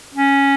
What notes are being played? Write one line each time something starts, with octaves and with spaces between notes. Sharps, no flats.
C#4